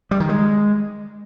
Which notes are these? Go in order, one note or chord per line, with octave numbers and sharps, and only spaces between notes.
G3
D#3
G#3